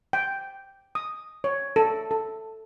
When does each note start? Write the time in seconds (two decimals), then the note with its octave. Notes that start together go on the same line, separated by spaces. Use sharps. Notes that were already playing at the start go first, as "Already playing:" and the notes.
0.13 G5
0.95 D#6
1.44 C#5
1.76 A4
2.11 A4